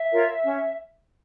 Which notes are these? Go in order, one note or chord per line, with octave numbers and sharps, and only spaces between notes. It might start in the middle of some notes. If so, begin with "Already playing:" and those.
Already playing: E5
F4 A#4 C#5
C#4